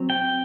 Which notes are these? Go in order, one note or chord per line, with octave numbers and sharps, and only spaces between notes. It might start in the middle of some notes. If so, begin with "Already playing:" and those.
Already playing: F#3 C4
G5